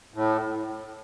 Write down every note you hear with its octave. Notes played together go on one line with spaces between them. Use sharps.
A2